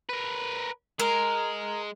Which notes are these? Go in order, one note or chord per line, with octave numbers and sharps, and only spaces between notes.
A#4 B4
G#3 A#4